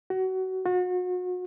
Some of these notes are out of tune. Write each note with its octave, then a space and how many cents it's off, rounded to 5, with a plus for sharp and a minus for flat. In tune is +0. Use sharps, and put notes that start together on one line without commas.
F#4 +25
F#4 -35